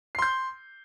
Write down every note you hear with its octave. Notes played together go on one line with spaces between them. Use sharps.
C6 G6 C7